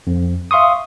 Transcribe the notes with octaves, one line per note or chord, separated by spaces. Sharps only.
F2
E5 F5 C6 C#6 D#6